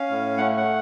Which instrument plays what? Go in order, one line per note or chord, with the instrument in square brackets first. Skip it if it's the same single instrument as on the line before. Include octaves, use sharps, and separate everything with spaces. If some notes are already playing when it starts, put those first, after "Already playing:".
Already playing: [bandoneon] C#4 F5
A2
A3 F#5
F#5